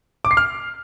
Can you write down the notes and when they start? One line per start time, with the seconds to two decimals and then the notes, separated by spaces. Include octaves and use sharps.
0.25 D6
0.31 C7
0.37 F6